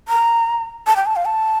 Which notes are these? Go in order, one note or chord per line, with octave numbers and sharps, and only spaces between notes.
A#5
A5
G5
A5
F5
A5